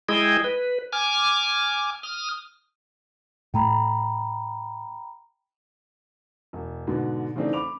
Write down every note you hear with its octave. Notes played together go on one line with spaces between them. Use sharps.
G#3 E4 G#4 D#5 G5
B4
G#5 D6 F6
D#6 F6
A2 A3 G5 A#5 B5
E1
G#2 B2 D3
C#3 E3 A3 C4 D4 D#4
B5 D6 F7